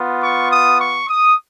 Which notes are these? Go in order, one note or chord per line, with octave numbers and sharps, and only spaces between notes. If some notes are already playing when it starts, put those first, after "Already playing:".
Already playing: B3 F4
C#6
D#6
C#6
D#6